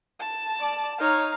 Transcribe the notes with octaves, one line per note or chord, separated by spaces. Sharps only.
A5
D5 D6
D#4 C#5 F5 A#5